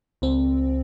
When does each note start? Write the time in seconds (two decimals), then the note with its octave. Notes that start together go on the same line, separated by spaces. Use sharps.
0.22 C#2 C4